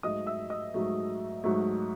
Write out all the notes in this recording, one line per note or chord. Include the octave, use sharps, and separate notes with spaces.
G#2 F#3 A3 D#5 D#6
E5 E6
D#5 D#6
G#2 F#3 A3
G#2 F#3 A3